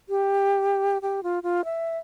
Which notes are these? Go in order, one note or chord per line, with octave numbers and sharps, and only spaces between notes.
G4
G4
F4
F4
E5